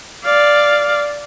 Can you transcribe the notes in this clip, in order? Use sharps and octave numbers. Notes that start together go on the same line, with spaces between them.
D5 F5